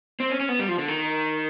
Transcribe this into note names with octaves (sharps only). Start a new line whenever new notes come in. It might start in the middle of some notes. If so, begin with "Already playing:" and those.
C4
C#4
C#4
B3
G3
F3
D3
D#3